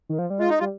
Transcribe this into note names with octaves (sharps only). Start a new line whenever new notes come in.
D#3
F3
G3
G#3 F4
D#4
G3 F4